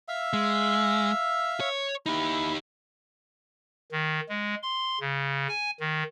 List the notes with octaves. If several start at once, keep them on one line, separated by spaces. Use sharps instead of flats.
E5 F5 E6
G#3
C#5
D#4 E4 G4
D#3
G#3
C6
C#3
G#5
D#3